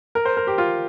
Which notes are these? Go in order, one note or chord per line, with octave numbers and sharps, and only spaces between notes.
A#4
C5
A#4
G4
F4